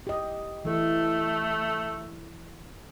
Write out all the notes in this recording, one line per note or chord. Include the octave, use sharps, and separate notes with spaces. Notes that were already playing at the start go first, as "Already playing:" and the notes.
G4 D#5
E3 A3 A4